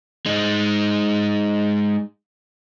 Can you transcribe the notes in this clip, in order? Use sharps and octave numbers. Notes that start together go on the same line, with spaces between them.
G#3 D#4